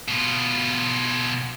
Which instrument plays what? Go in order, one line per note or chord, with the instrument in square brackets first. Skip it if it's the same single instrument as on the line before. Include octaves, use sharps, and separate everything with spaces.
[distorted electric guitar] B2 F4